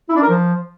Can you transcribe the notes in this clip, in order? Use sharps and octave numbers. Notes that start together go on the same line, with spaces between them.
E4
D4
A#4
F3